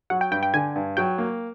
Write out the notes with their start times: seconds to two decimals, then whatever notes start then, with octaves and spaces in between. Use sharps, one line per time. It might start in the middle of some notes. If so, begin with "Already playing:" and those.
0.10 F#3 F#5
0.21 G5
0.31 G2 G5
0.43 G5
0.54 D3 G#5
0.76 G2
0.97 F#3 G5
1.18 A#3